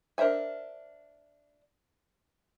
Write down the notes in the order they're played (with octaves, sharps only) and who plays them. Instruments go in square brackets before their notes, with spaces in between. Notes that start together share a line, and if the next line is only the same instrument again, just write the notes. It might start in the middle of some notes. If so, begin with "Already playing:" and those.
[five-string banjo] D4 A#4 C5 E5 G#5